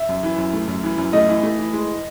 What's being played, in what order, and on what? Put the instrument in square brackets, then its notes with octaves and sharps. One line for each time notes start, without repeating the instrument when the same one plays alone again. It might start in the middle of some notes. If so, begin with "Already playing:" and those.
Already playing: [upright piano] E5
F#2
E3
F#2
A3
F#2
E3
F#2
A3 D#5
E3
A3
E3
G#3